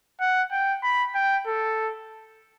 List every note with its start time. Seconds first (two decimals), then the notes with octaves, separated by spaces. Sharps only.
0.20 F#5
0.52 G5
0.83 B5
1.15 G5
1.47 A4